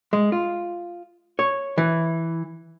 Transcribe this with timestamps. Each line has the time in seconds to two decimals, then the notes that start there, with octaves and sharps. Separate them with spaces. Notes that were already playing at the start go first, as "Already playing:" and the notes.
0.13 G#3
0.32 F4
1.39 C#5
1.78 E3